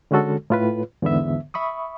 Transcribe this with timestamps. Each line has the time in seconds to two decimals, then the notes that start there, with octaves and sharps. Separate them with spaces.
0.11 D3 G#3 C#4 F#4 A4
0.50 A2 F4 B4
1.02 E2 G#2 D3 B3 E5
1.54 E5 B5 C#6 D#6